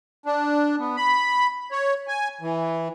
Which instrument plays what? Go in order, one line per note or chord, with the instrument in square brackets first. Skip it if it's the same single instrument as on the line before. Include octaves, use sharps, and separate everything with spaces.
[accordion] D4
B3
B5
C#5
G#5
E3